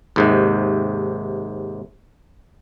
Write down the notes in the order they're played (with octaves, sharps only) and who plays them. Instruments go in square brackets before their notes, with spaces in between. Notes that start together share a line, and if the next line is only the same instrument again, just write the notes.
[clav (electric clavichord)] D#2 G#2 C3